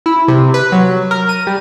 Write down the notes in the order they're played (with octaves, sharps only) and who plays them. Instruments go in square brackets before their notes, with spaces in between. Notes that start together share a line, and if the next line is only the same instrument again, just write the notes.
[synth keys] E4
C3
B4
F#3
A#4
D#7
G3